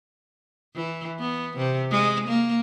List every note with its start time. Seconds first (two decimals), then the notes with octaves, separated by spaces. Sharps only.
0.75 E3
1.20 B3
1.57 C3
1.91 G#3
2.28 A#3